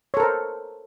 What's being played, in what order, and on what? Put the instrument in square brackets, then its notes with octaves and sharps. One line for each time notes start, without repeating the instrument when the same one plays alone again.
[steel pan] C#5
A4
A#4
C5